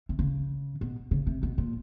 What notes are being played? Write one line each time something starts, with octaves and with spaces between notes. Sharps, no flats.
C3
C#3
B2
C#3
C3
B2
A#2